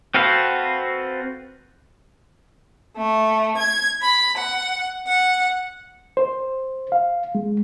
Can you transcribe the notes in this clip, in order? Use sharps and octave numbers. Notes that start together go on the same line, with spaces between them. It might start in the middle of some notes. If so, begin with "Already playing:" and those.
C4 F#4 A4 B4 F5
A3
G#6
B5
F#5
F#5
C5
F5
G#3